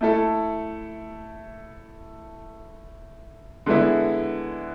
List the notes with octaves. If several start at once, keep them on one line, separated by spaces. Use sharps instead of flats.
A3 E4 A4
D3 G#3 B3 E4